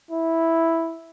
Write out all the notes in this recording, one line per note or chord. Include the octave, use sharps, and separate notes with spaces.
E4